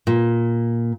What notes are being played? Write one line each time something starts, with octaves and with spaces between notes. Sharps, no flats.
A#2